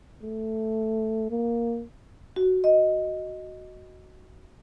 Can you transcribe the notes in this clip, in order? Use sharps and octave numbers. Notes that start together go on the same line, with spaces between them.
A3
A#3
F#4
D#5